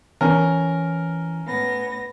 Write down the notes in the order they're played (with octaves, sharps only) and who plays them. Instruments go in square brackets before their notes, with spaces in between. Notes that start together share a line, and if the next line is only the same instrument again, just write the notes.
[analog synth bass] E3 [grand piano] C#4 [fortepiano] A#4
[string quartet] A2 B3 A#6